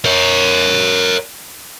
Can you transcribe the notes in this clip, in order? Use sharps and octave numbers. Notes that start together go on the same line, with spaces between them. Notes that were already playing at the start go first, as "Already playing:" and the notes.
A#4 C#5